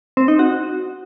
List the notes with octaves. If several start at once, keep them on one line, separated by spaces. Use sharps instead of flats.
C4
D#4
F#4